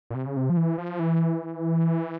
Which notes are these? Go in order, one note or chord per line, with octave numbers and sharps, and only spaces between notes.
A#2
C3
C#3
C3
F3
E3
F3
E3